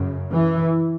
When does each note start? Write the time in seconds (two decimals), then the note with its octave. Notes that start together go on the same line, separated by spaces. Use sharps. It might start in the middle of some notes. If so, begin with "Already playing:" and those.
Already playing: F#2 C#3
0.33 E3